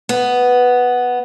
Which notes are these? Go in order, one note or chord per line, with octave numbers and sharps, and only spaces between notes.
B3